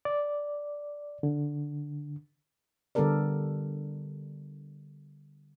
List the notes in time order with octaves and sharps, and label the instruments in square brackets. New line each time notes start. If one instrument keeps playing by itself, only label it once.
[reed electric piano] D5
D3
[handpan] D3 G3 B3 A4 A#4 D5